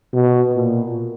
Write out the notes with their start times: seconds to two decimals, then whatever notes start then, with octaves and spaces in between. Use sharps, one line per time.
0.13 B2
0.53 A#2